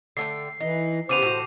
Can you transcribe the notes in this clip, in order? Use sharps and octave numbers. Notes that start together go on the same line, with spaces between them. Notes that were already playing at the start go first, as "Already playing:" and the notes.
D3 A3 G5 C7
E3 D#4
C#3 B3 G4 C5 D6 D#7 F7
A2 F#4